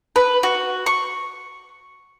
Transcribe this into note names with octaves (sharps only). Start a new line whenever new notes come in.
B4
F#4
C#6